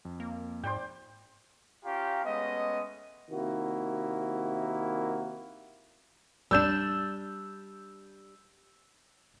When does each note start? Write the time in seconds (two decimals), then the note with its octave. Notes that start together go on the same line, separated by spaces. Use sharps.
0.05 F2
0.20 A#3
0.64 G#2 C5 D5 G5
1.84 C#4 F4 G4 C#5 F5 A#5
2.24 G#3 A3 B3 C#4 D#5
3.30 C3 D#3 A#3 E4 F#4
6.51 G3 D4 E6 G6 E7